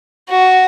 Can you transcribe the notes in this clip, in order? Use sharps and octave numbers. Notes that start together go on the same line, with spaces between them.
F#4